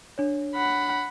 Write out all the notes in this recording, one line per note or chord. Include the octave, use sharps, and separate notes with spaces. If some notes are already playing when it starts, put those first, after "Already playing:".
D4 C#5
F#5 B5